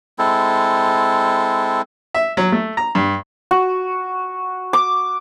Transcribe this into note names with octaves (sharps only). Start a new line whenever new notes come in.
G#3 C4 E4 A4
E5
F#3
A3
A#5
G2
F#4
D6